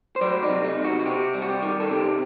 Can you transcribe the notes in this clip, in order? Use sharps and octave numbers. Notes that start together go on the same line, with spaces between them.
C5
F#3 D5
D#4
C3
D#4
C3
F#4
F#4
C3 G4
G3
F#4
G4
D#3
A4
C3 G4